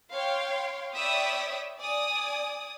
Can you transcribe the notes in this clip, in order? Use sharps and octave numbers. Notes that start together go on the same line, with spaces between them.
C#5 F5 G5 C6
C#5 D5 E5 G5 B5 D#6
D5 G#5 D#6